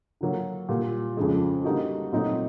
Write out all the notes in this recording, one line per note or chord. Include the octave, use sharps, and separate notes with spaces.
D3 F#3 A#3
A#2 G3 A#3
F2 C#3 F3 G#3
D3 G3 A#3 D#4 F#4
A#2 F#3 A3 C4 D#4